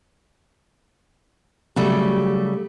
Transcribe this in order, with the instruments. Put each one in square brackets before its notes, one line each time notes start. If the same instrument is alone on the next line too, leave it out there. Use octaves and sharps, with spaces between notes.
[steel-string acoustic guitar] C#3 G3 A3 [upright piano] F#3 F#4 [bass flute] G4